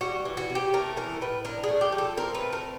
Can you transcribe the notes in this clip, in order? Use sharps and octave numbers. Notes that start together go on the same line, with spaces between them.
G3 F#4
E3
F#4
C3
G4
A3 A#4
E3 A#4
A2 B4
D4 A#4
G#4
A3
G4
F3
A4
C4 A#4
B4
A3
A#4